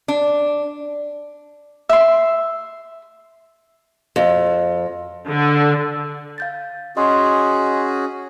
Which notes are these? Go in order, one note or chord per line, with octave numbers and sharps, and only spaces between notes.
D4
E5 C6
F2
D3
F5 G6 A6
C#4 F#4 G#4 D#5 C6 D#6